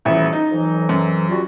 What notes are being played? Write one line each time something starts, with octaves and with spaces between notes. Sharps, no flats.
D#1 A1 E5
D#4
F2 E3 F#3
F#2
G3 F4 F#4